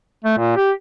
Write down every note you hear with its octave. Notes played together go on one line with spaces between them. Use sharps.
A3
A#2
G4